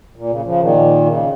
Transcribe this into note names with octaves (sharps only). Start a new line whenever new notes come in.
A#2
C#3
C#3 F3
A#2 D#3
C#3